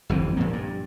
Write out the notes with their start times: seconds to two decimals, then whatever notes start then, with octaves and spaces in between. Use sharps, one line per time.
0.09 G1 F2 E3 C4
0.37 A#2 F3 A#3
0.53 G2